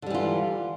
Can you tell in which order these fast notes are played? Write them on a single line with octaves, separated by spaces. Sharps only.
D3 G3 E3 F4